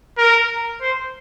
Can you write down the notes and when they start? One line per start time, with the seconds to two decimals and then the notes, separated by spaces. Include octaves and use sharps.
0.18 A#4
0.82 C5